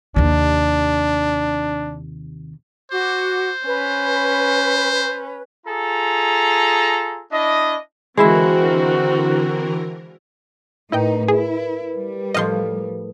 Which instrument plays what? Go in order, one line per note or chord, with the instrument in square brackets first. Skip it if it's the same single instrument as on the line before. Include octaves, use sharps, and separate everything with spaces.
[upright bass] D#2 C3 [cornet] D4
[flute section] F#4 D6 [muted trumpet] C5
[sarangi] C#4 [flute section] B4
[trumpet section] F4 G#4 A4 A#5
D4 E4 D#5
[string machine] D3 E3 A#4 [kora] G#3 E4 E5 [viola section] C4 F#4
[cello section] A2 D#4 [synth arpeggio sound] E4 D#5 G5 [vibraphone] A#4 B4
[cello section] E4 [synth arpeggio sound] G#4
[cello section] G3
[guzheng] A2 F3 [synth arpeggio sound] D#5 F5 C6